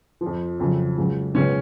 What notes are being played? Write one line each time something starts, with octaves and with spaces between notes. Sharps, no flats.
F3
F2
F2 C#3 F#3
C#2 C#3 F#3
C#2 B2 F#3 C#4